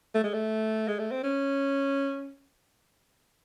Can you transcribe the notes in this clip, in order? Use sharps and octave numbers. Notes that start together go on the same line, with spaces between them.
A3
G#3
A3
G#3
A3
C4
C#4